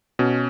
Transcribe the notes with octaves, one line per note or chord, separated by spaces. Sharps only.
B2 C#4